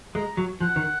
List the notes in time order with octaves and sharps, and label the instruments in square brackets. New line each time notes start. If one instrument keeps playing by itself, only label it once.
[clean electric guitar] G#3 [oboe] A#5
[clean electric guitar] F#3
[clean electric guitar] F3 [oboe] F#5
[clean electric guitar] D#3